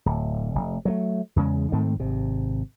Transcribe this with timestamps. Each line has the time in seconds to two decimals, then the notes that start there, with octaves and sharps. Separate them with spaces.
0.06 D1
0.55 F1
0.85 F#3 G3 A3
1.36 E2 C#3 G#3
1.72 G#2 D#3 A3 C4
2.00 G#1 C3